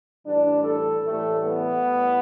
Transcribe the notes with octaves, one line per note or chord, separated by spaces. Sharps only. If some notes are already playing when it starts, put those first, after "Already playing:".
A2 E3 G3 D4
A4
A2 E3 G3 A3
B3
A2 G3